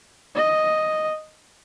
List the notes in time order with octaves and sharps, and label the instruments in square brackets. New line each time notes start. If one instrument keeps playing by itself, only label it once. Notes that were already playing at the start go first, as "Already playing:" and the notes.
[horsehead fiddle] D#5